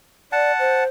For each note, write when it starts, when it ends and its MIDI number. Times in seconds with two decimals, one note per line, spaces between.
0.32 0.52 74
0.32 0.84 78
0.32 0.84 81
0.59 0.88 72